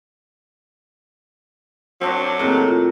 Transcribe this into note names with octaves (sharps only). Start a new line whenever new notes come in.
F#3 C4 D4 F#4
A2 D#3 A#3 C4 G#4
F4